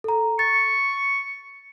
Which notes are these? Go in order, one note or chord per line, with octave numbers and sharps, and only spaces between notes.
A4 A#5
C#6 A6